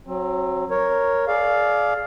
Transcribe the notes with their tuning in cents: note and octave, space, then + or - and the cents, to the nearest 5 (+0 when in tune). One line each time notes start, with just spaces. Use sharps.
F#3 +0 C4 +30
A#4 +0 C#5 +0
G#4 +35 D5 +0 F5 +0